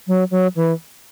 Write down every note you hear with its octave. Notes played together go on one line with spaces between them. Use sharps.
F#3
F#3
E3